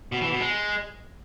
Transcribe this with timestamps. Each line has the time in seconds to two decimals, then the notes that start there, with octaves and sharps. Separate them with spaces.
0.12 B2
0.21 E3
0.31 B2
0.40 G#3